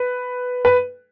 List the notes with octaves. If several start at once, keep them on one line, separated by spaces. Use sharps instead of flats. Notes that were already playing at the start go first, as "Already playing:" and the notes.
Already playing: B4
B4